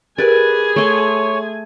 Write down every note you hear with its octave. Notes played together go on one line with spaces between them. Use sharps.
G4 G#4 A#4 B4 D5 G#5
A3 C#5 C6